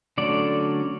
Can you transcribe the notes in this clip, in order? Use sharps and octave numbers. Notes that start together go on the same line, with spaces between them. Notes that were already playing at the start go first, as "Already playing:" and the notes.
D3 F#3 A3 C#4 D5